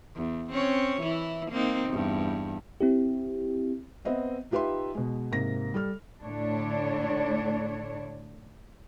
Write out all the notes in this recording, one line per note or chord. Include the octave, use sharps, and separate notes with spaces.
E2
C4 C#4 C#5
E3 E4
A#3 C4 D#4
E2 G2
C4 E4 G4
B3 C4 D#5 E5
D#4 F4 G4 B4 E5 C6
B2 G#3
G#2 C3 A#3 A#6
G3 A4 F6
A2 D3 A3 D4 C#5